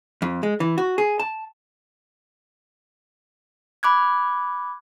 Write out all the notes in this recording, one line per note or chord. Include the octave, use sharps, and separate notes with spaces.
F2
G#3
E3
F#4
G#4
A5
B5 D6 F#6 G#6